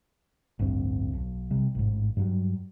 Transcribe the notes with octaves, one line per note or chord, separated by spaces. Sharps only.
A1 D2 G2 C4
B1
C3 G3
A1 G#2
G2 F#3 G3